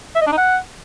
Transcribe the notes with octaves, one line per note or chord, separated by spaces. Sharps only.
E5
D#5
D4
D#4
F#5